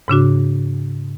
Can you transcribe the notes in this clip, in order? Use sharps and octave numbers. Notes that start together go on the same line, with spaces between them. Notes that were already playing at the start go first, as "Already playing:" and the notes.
G#2 C#3 D4 F#4